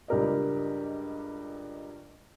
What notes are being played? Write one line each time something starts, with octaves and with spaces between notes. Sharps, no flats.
C#2 G2 G4 A#4 D5 D#5